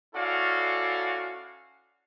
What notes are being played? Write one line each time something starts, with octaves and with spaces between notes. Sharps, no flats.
C#4 E4 F#4 A4 D5 F5